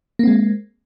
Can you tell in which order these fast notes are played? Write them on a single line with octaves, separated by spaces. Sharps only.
A#3 C4 G#3